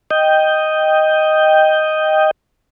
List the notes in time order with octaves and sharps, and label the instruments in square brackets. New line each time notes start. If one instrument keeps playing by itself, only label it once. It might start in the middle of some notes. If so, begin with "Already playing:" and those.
[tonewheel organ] D#5 G5